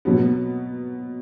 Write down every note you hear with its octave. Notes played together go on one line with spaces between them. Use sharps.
B2 F#3 B3